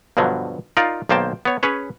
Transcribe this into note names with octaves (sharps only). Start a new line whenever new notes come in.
G2 B2 D3 F3 F#3
D#4 F4 A#4 D5 F5
B1 D#3 A#3 C5 G5 A5
B3 C#5
C#4 G#4 B4 C#5